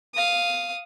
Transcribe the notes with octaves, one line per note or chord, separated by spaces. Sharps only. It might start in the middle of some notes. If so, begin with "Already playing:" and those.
F5 D#6